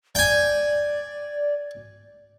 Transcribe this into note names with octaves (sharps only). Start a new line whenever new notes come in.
D5 G5 G#5